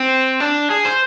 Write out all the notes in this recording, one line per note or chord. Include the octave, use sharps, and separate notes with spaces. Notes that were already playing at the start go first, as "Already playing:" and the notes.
Already playing: C4
D4
G#4
C5